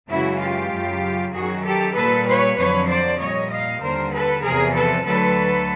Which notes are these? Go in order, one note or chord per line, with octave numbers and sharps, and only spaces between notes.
F#2 C#3 E3 G#3 E4 F#4
F4 G4
F#2 C#3 F#3
F#2 D#3 F#3 F#4 G#4
G4 A4
A#2 G3 A4 B4
B4 C#5
F2 D3 F#3 B4 C#5
C5 D5
A#2 G3 C#5 D#5
D#5 F5
D#2 D3 G3 A#4 C5
A4 B4
E2 C3 F3 G#4 A#4
A4 B4
D2 D3 F#3 A4 B4